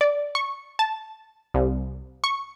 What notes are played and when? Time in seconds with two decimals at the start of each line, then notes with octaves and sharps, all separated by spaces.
0.01 D5
0.35 C#6
0.79 A5
1.54 C2
2.24 C#6